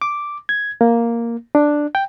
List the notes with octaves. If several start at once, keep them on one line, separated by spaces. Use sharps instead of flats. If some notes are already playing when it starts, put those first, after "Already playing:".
D6
G#6
A#3
D4
G5